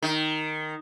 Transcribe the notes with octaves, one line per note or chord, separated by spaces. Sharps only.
D#3